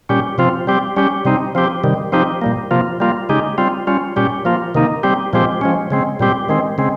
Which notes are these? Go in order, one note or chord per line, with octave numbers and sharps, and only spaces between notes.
A#2 G3 C#4 G4
C3 F3 C4 F4
G3 C4 G4
G3 C#4 G4
C3 G3 C4 D#4
F3 C4 G4
C3 D#3 G3
F3 C4 D#4 G4
A#2 G3 A#3
C3 F3 A#3 F4
G3 A#3 F4
C#3 G#3 D#4 G4
G3 C4 F4
G3 C#4 F4
A#2 G3 C#4 G4
F3 A#3 F4
C3 D#3 A#3 D#4
G3 C4 G4
A#2 F3 G#3 C4 G4
F3 G#3 C#4
C#3 G#3 C4
A#2 G3 C4 G4
D#3 G#3 C4
C#3 G#3 C4